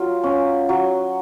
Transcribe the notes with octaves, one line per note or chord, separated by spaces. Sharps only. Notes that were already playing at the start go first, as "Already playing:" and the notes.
Already playing: F#3 F4
C#4
F#3